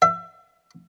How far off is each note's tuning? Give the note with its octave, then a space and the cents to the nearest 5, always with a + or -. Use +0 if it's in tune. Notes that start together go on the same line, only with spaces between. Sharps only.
E5 +30